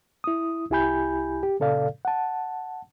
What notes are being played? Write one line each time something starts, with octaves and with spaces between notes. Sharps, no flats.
E4 D#6
C2 E4 G4 G#5 B5 G6
G4
A#2 C#3 A4 D5 F5
F#5 A5